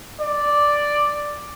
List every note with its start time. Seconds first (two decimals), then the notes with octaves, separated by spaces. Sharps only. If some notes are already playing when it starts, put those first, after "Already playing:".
0.21 D5